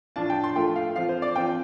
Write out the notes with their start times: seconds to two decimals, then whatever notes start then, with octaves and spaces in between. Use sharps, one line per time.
0.16 A2 F3 D4 F4 A5
0.30 G5
0.44 C6
0.56 F3 A3 F4 G5
0.76 F5
0.96 F3 C4 F4 F5
1.09 C5
1.22 D5
1.35 F3 C4 F4 G5